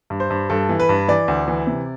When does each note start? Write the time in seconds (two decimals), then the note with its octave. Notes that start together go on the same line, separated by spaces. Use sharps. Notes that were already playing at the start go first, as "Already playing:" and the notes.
0.10 G2
0.20 C5
0.30 G2
0.50 G2 A4
0.69 E3
0.80 B4
0.89 G2
1.08 E3 D5
1.28 D2
1.48 E3
1.67 C3